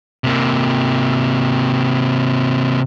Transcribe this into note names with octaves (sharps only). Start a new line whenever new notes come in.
C3 A#3